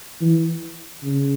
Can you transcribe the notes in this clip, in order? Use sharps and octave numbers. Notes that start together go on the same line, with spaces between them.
E3
C#3